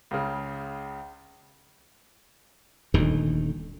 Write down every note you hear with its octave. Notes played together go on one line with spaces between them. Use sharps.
C#2 C#3
D#1 D2 D#3